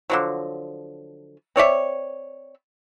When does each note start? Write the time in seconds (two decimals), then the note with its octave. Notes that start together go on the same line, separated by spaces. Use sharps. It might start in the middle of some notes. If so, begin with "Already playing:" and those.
0.10 D3 F3 F#3
1.56 C4 C#5 D5 E5